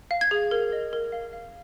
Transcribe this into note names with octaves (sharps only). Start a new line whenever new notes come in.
F5
G#6
G#4
A#4
D#5
A#4
F5
F5